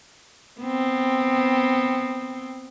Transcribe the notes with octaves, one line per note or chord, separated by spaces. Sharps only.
B3 C4